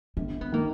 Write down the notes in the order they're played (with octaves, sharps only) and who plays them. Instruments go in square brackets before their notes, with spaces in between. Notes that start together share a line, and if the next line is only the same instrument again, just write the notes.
[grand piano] G1 [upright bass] C4
[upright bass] B3
[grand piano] D#3 [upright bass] A#3